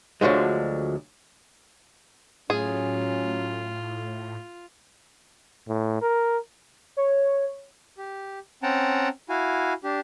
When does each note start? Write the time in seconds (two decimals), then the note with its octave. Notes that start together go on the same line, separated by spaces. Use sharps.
0.21 D2 D3 F3 F#3 G#3
2.50 A2 F#3 C#4 F4 G#4
5.68 A2
6.02 A#4
6.97 C#5
7.98 G4
8.63 C4 C#4 F#5 G5 A5 A#5
9.29 E4 F#4 F5 G#5
9.84 D4 G4